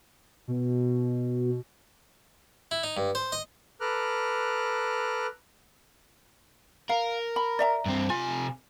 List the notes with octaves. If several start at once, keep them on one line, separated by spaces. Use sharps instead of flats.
B2
E4
D#4
G2
C5
D#5
A4 B4 A#5 D6 F6 F#6
A#4 F5
B5
D5 E5 A#5
G2 C4
C3 F4 G#5